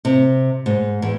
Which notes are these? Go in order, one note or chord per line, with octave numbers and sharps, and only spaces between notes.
C3
G#2
E2